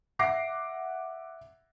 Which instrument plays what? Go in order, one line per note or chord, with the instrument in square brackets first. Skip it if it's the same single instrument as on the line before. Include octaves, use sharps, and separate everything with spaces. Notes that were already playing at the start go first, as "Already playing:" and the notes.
[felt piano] E5 F#5 D6 A#6 C7